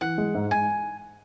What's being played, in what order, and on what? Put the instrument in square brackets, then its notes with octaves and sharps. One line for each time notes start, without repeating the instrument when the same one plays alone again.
[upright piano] E3 [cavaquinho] F#5
[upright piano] G#3
G#2
[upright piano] G#2 [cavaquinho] G#5